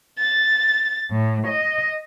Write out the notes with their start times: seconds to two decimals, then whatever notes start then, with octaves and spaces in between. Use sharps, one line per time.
0.18 A6
1.10 A2
1.47 D#5